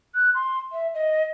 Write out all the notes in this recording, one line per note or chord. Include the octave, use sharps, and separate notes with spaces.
F#6
C6
E5
D#5